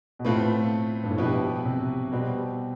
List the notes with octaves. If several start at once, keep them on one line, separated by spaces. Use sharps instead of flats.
B2
A2 A3 C4 F4 B4
G2
A2
B2 F3 B3 E4 G4 B4
C3
B2 G3 C4 G4 B4